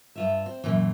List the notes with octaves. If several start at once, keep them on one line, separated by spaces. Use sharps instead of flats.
G2 F4 E5
C4
F#2 A#2 E3